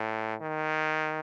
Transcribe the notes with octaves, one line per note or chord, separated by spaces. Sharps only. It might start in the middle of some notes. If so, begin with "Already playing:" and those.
Already playing: A2
D#3